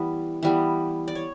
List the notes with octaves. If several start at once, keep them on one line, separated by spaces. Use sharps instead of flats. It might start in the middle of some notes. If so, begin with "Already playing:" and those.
Already playing: E3 G3 B3
E3 G3 B3
D5
C#5